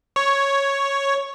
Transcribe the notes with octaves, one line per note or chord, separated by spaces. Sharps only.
C#5